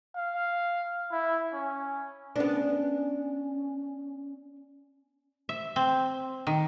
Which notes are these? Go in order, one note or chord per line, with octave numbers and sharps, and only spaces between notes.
F5
E4
C#4
B3 C#4 D4
E5
C4
D#3